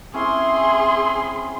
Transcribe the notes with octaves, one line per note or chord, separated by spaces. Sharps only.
C4 C#4 E4 G#4 C6